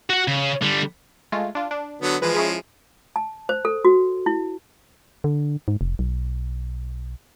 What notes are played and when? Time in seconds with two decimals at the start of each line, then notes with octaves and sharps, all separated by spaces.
0.10 F#4 F#5
0.28 C#3
0.62 D3 G3
1.32 G#3 A3 F4
1.55 D4 F4
1.71 D4
2.01 D3 F#3 B3
2.22 E3 F3 G#3 B4
2.34 C#4 E4 G#4
3.16 A5
3.49 C5
3.65 A4
3.85 F#4
4.26 E4
5.24 D3
5.68 G#2
5.81 F1
5.99 B1